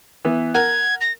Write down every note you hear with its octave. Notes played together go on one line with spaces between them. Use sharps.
E3 B3
A#4 F#5 G#6
A#6